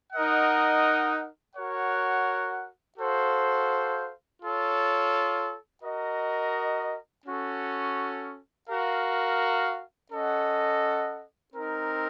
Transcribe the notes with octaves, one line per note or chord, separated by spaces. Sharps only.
D#4 A#4 D#5 F#5
F#4 A#4 C#5 F#5
F#4 A4 C5 F5
F4 A4 C#5
F#4 A#4 D#5
C#4 F#4 A4
F#4 A#4 F5
C#4 A4 D#5 F#5
C4 D#4 A#4